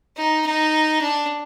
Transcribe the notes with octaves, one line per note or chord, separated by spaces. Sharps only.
D#4
D#4
D4